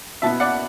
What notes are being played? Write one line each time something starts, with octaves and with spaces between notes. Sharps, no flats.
B2 B3 E4 E5 A5
D5 F#5